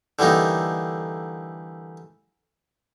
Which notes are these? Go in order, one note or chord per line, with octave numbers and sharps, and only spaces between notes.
D3 E3 G3 A#3 D#4